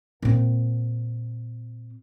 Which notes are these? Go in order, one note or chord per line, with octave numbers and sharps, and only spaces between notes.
A#2 C4